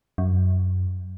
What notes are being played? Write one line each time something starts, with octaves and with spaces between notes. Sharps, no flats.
F#2